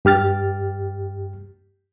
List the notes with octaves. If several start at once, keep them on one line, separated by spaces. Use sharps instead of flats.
G2 G4 F6 A6